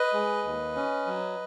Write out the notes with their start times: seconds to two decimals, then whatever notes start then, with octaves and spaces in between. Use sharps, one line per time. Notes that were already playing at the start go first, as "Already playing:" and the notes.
Already playing: B4 D#5
0.13 G#3
0.44 D#2
0.76 C#4
1.06 F#3